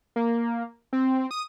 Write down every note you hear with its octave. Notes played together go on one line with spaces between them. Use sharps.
A#3
C4
D#6